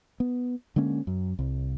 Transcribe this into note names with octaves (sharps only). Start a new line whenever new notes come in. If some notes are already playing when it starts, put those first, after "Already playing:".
B3
D3 G#3 A#3 C#4
F#2
C2